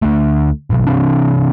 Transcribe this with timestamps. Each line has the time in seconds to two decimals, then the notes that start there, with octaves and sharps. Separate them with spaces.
0.02 D2 A3
0.70 G#1 B2 F#3
0.87 C3 E3 C4 D4